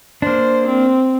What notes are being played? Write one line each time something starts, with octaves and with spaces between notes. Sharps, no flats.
A#3 D4 C5
C4